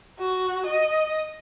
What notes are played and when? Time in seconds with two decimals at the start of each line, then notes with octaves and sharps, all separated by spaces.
0.19 F#4
0.66 D#5